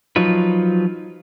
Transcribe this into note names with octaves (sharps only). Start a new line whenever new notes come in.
F3 F#3 D#4 F4 B4